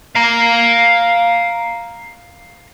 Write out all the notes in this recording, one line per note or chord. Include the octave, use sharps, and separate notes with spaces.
F5 A#5